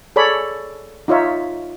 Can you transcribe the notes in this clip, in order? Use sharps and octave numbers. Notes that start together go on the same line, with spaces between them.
G#4 A4 C#5 D5 B5
D#4 F4 C#5 E5